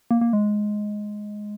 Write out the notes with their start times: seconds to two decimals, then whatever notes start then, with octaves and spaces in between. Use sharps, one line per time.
0.11 A#3
0.21 A#3
0.33 G#3